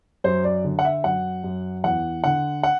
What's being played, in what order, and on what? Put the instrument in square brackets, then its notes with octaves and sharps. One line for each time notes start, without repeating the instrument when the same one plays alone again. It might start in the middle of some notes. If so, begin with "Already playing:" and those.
[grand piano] F#2 C5
D5
D3
F#5
E5
F#2 F#5
F#2
E2 F#5
D3 F#5
F#5